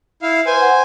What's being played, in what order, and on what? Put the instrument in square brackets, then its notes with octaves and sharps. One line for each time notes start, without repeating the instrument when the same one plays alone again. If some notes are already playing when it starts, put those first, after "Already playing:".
[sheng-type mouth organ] E4 F5
[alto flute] B4 [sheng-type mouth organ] C5 G#5
[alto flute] F#5